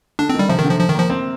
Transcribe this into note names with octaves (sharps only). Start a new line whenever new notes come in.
D3 D4
C4
D#3
G3
C3 F3
D#3
D3
F3
F3
D#3
F3 A#3
C4